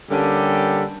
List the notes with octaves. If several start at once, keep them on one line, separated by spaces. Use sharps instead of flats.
D3 G3 A#3 C#4 G4 A4